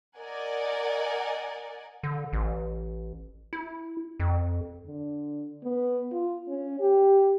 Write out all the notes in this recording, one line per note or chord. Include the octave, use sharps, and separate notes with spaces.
A#4 D5 D#5 F#5 G#5
D3
A1
E4
F2
D3
B3
F4
C#4
G4